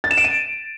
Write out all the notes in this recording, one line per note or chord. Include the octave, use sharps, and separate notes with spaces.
A6
E7
D7
D#7